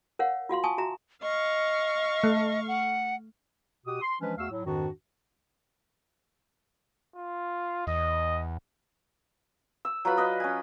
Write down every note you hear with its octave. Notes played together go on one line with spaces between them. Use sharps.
A#4 C#5 F5 F#5
F4 F#4 F5 C6
G#5 A5 C#6 D#6
F#4 E5 A#5
D#5 F5 C#6
A3
F#5
B2 F#4 G4 D#6
C6
E3 F3 G#3 C#4 D4 B4
E2 A3 F#4 F5 E6
A2 F#3
F2 G#2 D#3 D4 F#4
F4
E2 D#5
E6
F#3 F4 B4 B5
B4 D5 D#5
C#4 G#5